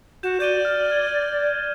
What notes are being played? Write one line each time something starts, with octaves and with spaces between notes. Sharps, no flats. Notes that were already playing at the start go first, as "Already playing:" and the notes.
F#4 G6 E7
D5 G6 D#7 G7
F6
F6 G#6